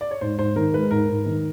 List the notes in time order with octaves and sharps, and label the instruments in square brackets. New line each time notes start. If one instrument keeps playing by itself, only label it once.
[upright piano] D5
C#5
[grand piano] G#2 [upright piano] C5
[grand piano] G#2 [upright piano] C5
[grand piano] D#3 [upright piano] A#4
[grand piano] G#3 [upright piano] B4
[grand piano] G#2 [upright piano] A#4
[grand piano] G#2
D#3